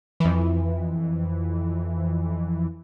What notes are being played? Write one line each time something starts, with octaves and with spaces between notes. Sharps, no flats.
F2 E3